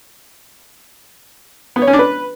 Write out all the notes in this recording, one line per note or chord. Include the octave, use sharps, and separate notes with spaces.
B3
C#5
C#4
D4
B4